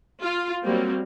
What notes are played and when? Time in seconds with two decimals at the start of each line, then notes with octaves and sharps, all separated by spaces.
0.22 F4
0.63 F#3 G3 A#3 C4